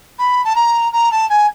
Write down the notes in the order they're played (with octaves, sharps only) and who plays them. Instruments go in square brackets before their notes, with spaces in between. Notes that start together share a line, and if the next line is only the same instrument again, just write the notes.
[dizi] B5
A5
A#5
A#5
A5
G#5